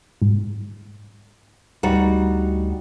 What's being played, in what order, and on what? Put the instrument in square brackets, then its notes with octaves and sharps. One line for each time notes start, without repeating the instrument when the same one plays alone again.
[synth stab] G#2
[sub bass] D2 [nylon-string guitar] G3 D#4 F#4